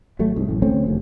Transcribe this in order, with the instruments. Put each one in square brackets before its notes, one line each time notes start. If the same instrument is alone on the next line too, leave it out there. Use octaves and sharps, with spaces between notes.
[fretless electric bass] G#1 F#3 A3
C2 G#2
A1 F#2 A2
D2 A3 C4 C#4
F1 D#2